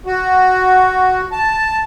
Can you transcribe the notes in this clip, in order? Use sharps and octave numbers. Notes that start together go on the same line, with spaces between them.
F#4
A5